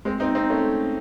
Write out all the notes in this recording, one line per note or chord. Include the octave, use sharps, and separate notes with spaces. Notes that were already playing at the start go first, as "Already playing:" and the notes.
G#3 C4
C4 D#4
C4 D#4
A3 C#4